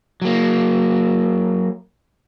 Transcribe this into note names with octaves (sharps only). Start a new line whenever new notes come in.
F#3 A#3